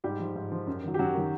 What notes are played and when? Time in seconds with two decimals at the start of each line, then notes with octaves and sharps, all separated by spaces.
0.04 G#2 G3 G4
0.19 F3
0.36 G#2
0.52 F3
0.67 F#2
0.84 D#3 F#3
0.94 G4
0.99 F#2 F#3 F#4
1.15 D#3 F#3